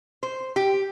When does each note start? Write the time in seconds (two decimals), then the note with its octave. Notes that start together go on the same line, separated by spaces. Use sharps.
0.23 C5
0.56 G4